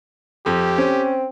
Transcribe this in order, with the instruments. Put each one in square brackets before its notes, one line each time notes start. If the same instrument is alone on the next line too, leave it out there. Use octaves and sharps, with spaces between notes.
[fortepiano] F2 [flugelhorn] G4
[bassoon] C4 [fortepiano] C#4